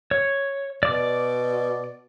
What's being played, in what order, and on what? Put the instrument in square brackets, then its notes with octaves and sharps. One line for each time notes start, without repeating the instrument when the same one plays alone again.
[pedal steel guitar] C#5
[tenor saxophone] B2 [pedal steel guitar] D5 D6